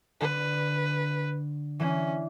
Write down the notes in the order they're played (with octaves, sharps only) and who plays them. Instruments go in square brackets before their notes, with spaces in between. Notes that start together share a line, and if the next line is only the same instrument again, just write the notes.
[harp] D3 [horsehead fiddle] B4
[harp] E3 D4 [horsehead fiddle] C#4